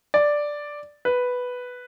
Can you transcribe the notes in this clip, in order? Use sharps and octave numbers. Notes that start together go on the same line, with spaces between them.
D5
B4